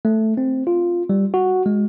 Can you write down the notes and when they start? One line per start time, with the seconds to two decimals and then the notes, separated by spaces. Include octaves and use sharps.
0.05 A3
0.37 C4
0.67 F4
1.09 G3
1.34 F#4
1.66 G#3